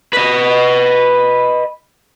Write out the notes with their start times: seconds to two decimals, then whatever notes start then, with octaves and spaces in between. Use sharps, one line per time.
0.13 B4 D#5